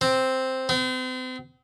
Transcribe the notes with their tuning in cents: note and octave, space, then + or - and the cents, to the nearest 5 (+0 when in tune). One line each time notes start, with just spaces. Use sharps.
C4 +0
C4 -40